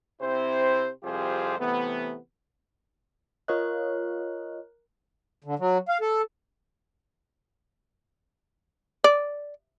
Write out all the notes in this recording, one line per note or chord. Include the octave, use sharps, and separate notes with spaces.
C3 C4 E4 C5
C2 F2 F4 G4 G#4 C5
C3 E3 A3 B3
F4 A#4 C#5 D#5 F#6
D3
F#3
F5
A4
D5